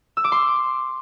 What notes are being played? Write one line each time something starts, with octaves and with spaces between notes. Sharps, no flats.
E6
D6
C6